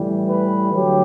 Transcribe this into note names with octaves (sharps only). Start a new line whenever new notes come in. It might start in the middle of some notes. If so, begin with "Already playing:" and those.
Already playing: A2 E3 G3
B4
D3 F#3 A3 G4